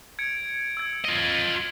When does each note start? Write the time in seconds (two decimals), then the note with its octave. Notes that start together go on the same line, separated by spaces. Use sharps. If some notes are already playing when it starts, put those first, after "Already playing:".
0.19 G#6 C#7 D7
0.77 E6 G#6
1.05 F4 D#5